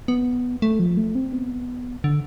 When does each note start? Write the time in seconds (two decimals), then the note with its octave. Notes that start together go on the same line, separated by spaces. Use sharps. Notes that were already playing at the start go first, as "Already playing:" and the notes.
0.08 B3
0.62 A3
0.79 F3
0.97 A3
1.15 C4
1.33 B3
2.04 D3